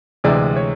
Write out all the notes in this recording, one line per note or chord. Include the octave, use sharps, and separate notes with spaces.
D2 C3 E3 G#3 D5
C#5